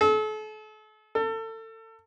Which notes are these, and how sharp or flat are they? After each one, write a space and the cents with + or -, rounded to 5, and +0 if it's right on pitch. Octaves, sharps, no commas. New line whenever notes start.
A4 -40
A4 +30